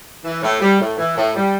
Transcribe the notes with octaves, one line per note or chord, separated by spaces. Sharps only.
E3
A2
G3
A2
E3
A2
G3